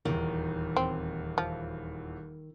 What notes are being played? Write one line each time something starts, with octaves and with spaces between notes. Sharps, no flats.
D#1 E2 D#3
C4
F3